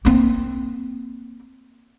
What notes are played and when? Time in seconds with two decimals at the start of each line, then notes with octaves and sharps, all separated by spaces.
0.05 A#3 C4